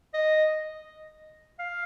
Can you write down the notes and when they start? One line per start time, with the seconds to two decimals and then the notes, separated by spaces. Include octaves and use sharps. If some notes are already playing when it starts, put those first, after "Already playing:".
0.14 D#5
1.59 F5